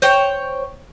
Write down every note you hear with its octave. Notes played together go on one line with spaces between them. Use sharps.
C5 C#5 G5